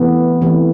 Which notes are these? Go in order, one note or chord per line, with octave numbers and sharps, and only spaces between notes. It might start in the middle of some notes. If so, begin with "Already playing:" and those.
Already playing: C3 E3 A3 B3
C3 E3 A3